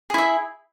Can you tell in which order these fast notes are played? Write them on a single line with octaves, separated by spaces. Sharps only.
G#4 E4 E5